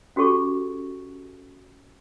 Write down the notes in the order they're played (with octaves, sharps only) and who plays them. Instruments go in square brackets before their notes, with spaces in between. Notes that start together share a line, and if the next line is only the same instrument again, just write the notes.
[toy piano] C#4 F#4 G4 A4 C#6